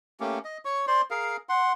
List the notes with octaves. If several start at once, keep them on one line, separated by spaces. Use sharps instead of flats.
A3 A#3 C#4 G4
D#5
C#5 C#6
C5 D5 C6
G#4 A#4 F5
F#5 C6